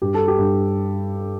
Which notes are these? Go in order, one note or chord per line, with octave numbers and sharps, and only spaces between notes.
G2 G4
A4
G4
G2